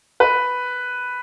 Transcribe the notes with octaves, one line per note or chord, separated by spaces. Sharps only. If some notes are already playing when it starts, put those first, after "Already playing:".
B4